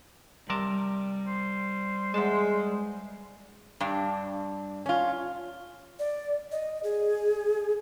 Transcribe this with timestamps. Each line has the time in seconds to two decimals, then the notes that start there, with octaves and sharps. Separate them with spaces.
0.50 C3 G3 A#4 A5
1.27 C5
2.14 E2 G#3 A5
3.80 G2 D4
4.86 C#4 F4
5.99 D5
6.52 D#5
6.84 G#4